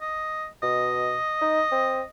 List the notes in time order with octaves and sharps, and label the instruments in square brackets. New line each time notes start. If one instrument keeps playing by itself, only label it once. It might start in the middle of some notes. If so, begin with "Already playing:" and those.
[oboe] D#5
[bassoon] B2 [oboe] D#5
[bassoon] D#4
C4